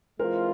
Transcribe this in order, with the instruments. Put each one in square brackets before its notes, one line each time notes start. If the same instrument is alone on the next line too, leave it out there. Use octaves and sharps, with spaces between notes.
[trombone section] E3 G#3 C4 F4 [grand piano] A#4 C5